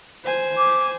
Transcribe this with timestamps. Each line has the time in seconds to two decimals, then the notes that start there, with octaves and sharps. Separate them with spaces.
0.24 C5 G#5
0.58 D6